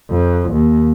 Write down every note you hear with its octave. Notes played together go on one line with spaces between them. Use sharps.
F2
D#2